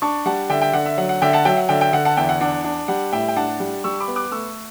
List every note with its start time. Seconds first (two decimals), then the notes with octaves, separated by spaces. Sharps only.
0.02 D4 A5 C#6
0.26 G3 F#5 A5
0.49 D3 E5 G5
0.62 E5 G5
0.73 D3 F#5
0.86 E5
0.98 F#3 F#5
1.09 F#5
1.22 D3 E5 G5
1.33 F#5 A5
1.45 F#3 E5 G5
1.57 F#5
1.69 D3 E5 G5
1.81 E5 G5
1.93 D3 F#5
2.05 F#5 A5
2.17 E2 E5 G5
2.29 F#5
2.41 D4 F#5
2.65 D4
2.88 G3 F#5
3.12 A2 E5 G5
3.28 G5
3.36 D4 F#5 A5
3.60 G3
3.84 G3 C#6 E6
4.00 B5 D6
4.08 B3
4.16 D6 F#6
4.31 A3 C#6 E6